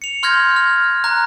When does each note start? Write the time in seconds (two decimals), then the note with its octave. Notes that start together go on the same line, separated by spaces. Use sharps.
0.02 C#7 F7
0.23 C6 F6 G6 G#6 A#6
0.56 F6
1.04 A#5 F#6